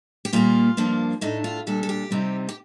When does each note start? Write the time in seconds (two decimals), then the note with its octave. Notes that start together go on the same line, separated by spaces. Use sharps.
0.25 G4
0.33 A#2 G3 A#3 F4
0.77 G2 F3 A#3 D4
1.21 A2 A3 D4 D#4
1.44 F4
1.67 A#2 G3 D4 A4
1.83 A4
1.89 G4
2.11 C3 G3 C4 D#4
2.49 G4